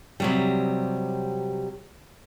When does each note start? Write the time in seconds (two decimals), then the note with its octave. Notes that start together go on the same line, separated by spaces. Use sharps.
0.20 C3 F#3 G3